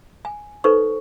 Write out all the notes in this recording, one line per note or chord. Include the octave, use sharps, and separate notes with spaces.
G#5
D#4 A4 B4 C5 C#6